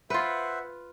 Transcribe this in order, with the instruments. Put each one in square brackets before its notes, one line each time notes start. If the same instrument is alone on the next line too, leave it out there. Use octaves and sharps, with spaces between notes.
[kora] F4 B4 [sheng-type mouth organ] C5 E5 F#5